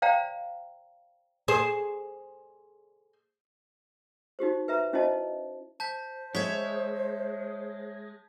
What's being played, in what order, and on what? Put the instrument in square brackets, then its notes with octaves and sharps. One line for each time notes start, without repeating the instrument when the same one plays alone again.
[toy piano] C5 D5 F5 G5 A#5
[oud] G#4 C5
[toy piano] D#4 F#4 G4 C5
B4 E5 A#5
C#4 E4 F#4 C5 D#5 A5
[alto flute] C5 [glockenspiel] A5 G6 B6
[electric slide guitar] G#3 [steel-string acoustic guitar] C#5 E5 [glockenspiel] G#6 B6